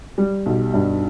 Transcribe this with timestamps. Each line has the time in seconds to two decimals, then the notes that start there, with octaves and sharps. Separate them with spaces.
0.18 G3
0.46 B1
0.74 G2